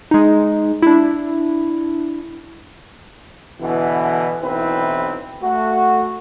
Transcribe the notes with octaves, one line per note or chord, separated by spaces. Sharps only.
G#3 D#4
D4 E4
B2 D3 E3
B1 E3 C4 E4 B4
A3 F#4